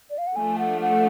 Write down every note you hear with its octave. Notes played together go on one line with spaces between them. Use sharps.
D5
F5
F#5
F3 A3 D4 G#5
F#5
F#5